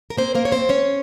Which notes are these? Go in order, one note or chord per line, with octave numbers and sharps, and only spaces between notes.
A#4
A#3 C4 C5
A#3 A#4
C#5
F2 C4 C5
C#4 C#5